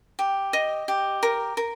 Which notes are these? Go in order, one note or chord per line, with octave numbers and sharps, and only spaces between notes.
G4
D#5
G4
A#4
A#4